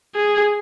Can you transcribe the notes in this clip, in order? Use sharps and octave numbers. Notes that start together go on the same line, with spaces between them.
G#4